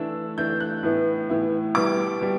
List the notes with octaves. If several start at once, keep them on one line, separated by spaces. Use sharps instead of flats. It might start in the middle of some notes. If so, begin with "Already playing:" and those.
Already playing: E3 A3 D4 E6
E3 A3 D4 G6
F#6
A2 E3 B3 E4
A2 E3 B3 E4
B2 G3 B3 E4 D6
B2 G3